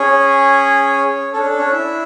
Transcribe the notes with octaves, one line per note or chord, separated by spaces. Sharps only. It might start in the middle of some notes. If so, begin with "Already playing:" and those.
Already playing: C#4 G#4 C#5
C#4 D4 A4 C#5
A4
C#4 C#5
E4 E5